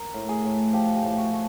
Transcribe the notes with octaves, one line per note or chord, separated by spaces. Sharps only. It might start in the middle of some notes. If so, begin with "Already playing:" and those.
Already playing: A#4
A2
G#4
A2
F3 G4
G4
A2
G4
F#4
A3